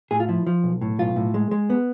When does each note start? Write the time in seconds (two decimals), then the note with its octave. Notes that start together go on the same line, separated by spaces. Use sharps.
0.11 A2 G#4
0.20 F4
0.29 F3 E4
0.47 F3
0.64 B1
0.81 A2
0.99 B1 F4
1.16 A2
1.34 G#3
1.51 G#3
1.70 B3